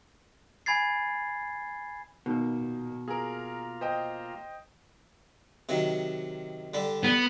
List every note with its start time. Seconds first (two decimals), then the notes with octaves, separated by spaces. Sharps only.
0.66 G#5 B5 G#6 A6 C7
2.26 B2 D#3 A#3
2.60 A#2
3.08 A#3 F4 G#4 A#4
3.81 C5 D#5 G5
5.69 C3 D#3 F#3
6.74 D3 G3 A4
7.03 B3